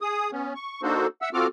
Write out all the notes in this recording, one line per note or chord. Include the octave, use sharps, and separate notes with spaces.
G#4 D#6
B3 C#4
C#6
A#3 D4 D#4 F#4 A4 C5
E5 F#5 E6
C4 F4 F#4 A4 D6 F6